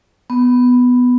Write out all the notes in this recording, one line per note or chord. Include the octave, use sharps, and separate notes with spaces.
B3